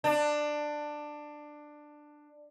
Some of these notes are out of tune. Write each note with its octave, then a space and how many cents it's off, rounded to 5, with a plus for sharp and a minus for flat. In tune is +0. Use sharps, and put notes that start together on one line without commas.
D4 +15